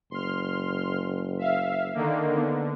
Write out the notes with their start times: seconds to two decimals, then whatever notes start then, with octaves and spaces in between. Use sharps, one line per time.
0.11 F#1 C6 F6
1.38 E5 F5
1.94 D3 D#3 A#3
2.37 D3 B3